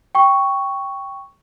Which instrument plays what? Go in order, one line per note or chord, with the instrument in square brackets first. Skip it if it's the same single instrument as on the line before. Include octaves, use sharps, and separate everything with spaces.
[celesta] G5 C#6